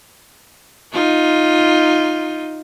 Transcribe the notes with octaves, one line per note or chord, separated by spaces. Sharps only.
D#4 F4